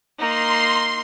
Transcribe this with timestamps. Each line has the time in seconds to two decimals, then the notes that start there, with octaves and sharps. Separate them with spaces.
0.19 A#3 D#4 C6